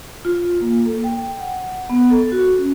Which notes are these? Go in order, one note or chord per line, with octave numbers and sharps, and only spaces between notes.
F4
A#3
A4
G5
F#5
B3
A4
F#4
C#4